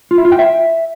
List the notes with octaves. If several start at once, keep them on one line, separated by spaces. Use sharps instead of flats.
F4
E4
F4
G5
E5